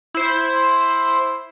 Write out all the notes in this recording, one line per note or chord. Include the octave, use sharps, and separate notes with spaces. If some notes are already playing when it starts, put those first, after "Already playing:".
E4 C5